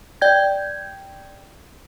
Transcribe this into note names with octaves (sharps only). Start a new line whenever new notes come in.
D5 G5 G6 G#6